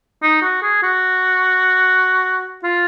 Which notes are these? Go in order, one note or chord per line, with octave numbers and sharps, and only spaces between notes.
D#4
F#4
G#4
F#4
F4